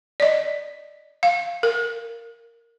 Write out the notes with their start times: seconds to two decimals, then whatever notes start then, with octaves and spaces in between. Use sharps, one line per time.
0.20 D5 D#5
1.23 F5
1.63 A#4